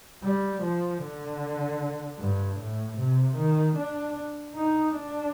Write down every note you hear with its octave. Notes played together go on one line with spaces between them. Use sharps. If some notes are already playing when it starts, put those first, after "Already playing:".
G3
F3
D3
G2
A2
C3
D#3
D4
D#4
D4